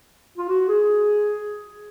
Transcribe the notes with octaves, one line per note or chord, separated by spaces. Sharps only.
F4
F#4
G#4